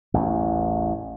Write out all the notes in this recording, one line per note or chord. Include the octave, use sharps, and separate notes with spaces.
A1 E2